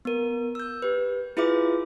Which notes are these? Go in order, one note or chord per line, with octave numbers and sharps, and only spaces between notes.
B3 A#4
E6 G6
G4 B4
E4 F4 G#4 B4 E5 D6